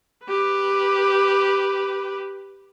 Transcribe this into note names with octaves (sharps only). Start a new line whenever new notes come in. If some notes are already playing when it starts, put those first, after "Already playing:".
G4 B4